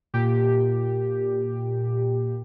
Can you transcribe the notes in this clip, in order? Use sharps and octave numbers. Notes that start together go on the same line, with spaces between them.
A#2 G4